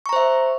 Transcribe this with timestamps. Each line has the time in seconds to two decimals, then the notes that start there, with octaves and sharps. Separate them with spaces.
0.06 C#6
0.09 A#5
0.13 C5
0.16 E5